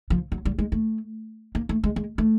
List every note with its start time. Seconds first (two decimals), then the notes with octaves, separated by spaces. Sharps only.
0.10 F3
0.32 F#3
0.45 G3
0.58 G#3
0.72 A3
1.55 A#3
1.69 A3
1.84 G#3
1.96 G#3
2.18 A3